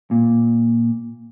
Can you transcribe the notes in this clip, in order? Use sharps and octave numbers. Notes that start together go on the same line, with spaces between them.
A#2